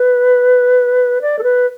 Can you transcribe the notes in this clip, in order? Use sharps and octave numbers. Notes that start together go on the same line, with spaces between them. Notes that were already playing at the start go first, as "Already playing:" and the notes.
Already playing: B4
D5
A4
B4